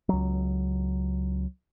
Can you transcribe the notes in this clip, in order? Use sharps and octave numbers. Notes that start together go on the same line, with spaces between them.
C#2 F#3